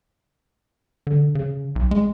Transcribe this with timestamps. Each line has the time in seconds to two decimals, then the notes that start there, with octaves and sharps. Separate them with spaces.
1.07 D3
1.35 C#3
1.76 B1
1.91 G#3